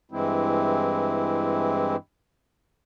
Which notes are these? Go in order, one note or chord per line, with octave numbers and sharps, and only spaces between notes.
G2 E3 G#3 C4 E4